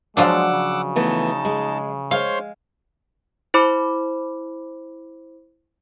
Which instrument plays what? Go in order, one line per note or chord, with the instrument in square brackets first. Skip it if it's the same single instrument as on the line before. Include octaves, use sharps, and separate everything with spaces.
[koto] F3 F#3 D4 [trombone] G#3 [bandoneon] F#5 D6 E6
[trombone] C#3
[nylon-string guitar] E3 A3 B3 [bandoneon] D#4 A5
[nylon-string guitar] G#3
[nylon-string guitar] G#3 [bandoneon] C5 C#5 C6 [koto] F5
[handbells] E4 C5 B5 D6